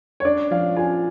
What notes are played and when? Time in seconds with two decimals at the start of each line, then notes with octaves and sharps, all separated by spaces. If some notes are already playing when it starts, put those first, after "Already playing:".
0.20 C#5
0.25 D4 D5
0.51 F3 F5
0.77 F4 G#5